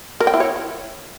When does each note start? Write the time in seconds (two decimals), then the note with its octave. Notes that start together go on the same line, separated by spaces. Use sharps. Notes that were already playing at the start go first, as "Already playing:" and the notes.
0.20 A#4
0.27 G5
0.34 E4
0.40 C#5